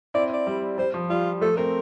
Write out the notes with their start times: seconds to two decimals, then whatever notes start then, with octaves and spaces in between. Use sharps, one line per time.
0.14 C4 E4 D5
0.33 D5
0.47 G3
0.78 G3 C5
0.94 F3
1.10 G3 F4
1.41 F3 A3 A4
1.57 A3 C4 A#4